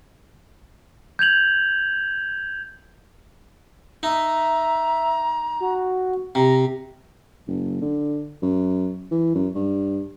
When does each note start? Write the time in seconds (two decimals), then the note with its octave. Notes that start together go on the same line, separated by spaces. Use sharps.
1.19 G6 G#6 F7 F#7
4.03 D#4 E5 A#5
5.60 F#4
6.35 C3 A#5
7.47 F#1
7.82 D3
8.42 F#2
9.11 E3
9.35 F#2
9.55 G2